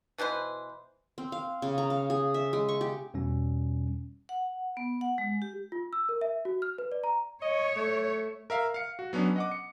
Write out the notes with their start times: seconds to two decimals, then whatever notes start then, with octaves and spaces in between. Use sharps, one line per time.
0.18 B2 E3 B4 C5
1.18 C4
1.32 F5
1.62 C#3
1.78 A#5
1.90 F5
2.10 G#4
2.34 E5
2.53 G#3
2.69 C#6
2.81 G4
3.14 E2 B2 G3 C#4
4.29 F#5
4.77 B3
5.01 F#5
5.18 G#3
5.42 G4
5.72 F4
5.93 E6
6.09 A#4
6.21 E5
6.45 F#4
6.62 F6
6.78 B4
6.92 D5
7.04 A#5
7.42 C#5 D#5
7.76 A3
8.50 A#4 E5 F5
8.74 F5 C#7
8.99 F#4
9.13 F#3 B3 C#4 D4
9.36 D#5 F#5 D6
9.51 C#7